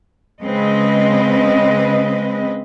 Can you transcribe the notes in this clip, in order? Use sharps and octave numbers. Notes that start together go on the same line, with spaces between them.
C#3 G#3 C4 B4 D#5